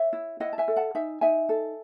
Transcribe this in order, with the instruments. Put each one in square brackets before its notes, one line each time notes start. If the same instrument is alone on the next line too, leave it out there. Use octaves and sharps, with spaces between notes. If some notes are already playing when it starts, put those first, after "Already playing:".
Already playing: [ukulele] C#5 E5
E4
E4 D#5 F#5
A5
E5 G#5
A4
F#5 A5
D#4 E5 G#5
D#4 E5 G#5
A4